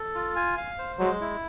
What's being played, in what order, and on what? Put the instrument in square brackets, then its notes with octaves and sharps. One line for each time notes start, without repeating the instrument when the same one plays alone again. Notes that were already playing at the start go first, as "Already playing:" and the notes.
Already playing: [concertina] A4
F4
G#5
F5
C5
[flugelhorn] F#3 [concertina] G#3
[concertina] E4